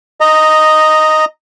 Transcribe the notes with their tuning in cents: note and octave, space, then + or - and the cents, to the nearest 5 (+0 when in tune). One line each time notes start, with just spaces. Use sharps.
D#5 +0 A#5 -10